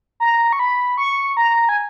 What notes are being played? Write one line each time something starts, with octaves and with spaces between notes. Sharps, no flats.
A#5
C#6
B5
C#6
A#5
G#5